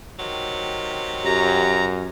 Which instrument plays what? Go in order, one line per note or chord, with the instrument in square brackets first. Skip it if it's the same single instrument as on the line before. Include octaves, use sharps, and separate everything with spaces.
[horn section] C3 D#3 F#3
[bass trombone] F#2 [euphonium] G4 [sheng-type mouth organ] A#5